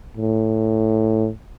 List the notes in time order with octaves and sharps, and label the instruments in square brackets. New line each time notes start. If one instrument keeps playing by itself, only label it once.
[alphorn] A2